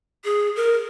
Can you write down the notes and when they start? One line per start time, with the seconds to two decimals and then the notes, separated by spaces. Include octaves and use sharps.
0.25 G#4
0.56 A#4